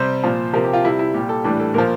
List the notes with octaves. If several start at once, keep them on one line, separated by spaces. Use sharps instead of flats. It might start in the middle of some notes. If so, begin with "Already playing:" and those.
Already playing: C3 G3 C5
A#2 F3
C3 F3 A#4
G4
F4
C3 G3 E4
E4
A#2 G3 G4
A4
A2 E3 G3 D4
A4
A#2 F3 A#4